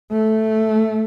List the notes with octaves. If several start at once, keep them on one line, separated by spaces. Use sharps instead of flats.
A3